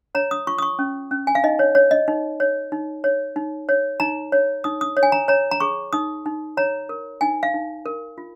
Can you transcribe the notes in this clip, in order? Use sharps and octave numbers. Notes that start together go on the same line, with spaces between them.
C#5 A#5
D#6
F4 C#6
D#6
C#6
C#4
C#4
G#5
F5
D#4 D#5
C#5
C#5
D#5
D#4
C#5
D#4
C#5
D#4
C#5
D#4 A#5
C#5
D#4 D#6
D#6
C#5
G#5
A#5
C#5 A#5
A#5
G#4 C#6
D#4 D#6
D#4
C#5 A#5
A#4
D#4 G#5
F5
D#4
A#4
F4